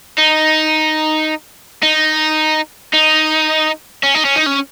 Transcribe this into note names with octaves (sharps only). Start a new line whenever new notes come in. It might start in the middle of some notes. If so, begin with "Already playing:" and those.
D#4
D#4
D#4
C#4
D#4
C#4
D#4
C#4